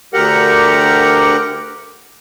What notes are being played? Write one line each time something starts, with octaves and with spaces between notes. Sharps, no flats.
D2 G4 A#4 F#5